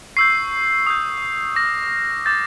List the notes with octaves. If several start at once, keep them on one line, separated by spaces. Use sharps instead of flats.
C#6 E6 G6 C7
D#6 G6
D6 F6 A#6
D6 G6 A6